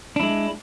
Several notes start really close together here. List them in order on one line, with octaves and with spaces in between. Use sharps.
D4 E4 G#3